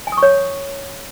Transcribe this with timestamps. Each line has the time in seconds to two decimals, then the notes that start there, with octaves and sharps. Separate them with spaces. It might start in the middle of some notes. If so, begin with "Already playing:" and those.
0.07 G#5
0.12 D#6
0.17 C#6
0.23 C#5